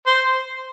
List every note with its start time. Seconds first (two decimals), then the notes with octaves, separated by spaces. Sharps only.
0.06 C5